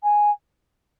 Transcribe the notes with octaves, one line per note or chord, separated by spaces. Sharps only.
G#5